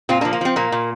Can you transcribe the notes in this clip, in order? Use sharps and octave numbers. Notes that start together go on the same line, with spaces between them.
A#2 C4 F4
A#3 D4
F3
A#3
F3 C4
A#2 A#3
A#2